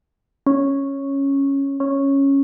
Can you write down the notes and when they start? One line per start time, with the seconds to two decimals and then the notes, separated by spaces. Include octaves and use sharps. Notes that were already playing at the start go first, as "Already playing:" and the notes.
0.47 C#4
1.80 C#4